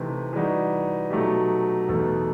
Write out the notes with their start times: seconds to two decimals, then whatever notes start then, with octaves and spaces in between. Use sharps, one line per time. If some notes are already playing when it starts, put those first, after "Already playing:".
Already playing: C3 E3 A3 C4 D#4
0.33 E3 G3 D#4 F#4
1.11 B2 F#3 A3 D#4 G4
1.88 E2 B2 A3 D#4 A4